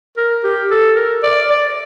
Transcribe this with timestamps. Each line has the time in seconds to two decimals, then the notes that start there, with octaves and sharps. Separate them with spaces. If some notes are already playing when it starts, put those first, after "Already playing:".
0.17 A#4
0.44 G4
0.71 A4
0.96 A#4
1.23 D5
1.50 D5